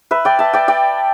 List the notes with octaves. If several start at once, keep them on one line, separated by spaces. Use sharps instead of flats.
B4 E5
D5 G5
E5 A5
D5 G5
D5 G5